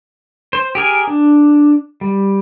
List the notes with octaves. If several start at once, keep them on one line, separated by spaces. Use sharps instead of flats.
C5
G4 G#4 A#4 G#5
D4
G3